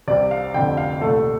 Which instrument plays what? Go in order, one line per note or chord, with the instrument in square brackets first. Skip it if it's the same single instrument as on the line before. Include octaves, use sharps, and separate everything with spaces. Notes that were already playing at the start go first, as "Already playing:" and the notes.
[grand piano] C2 C3 G3 C4 D5
F5
F1 F2 D3 G5
F5
C2 A#2 A3 A4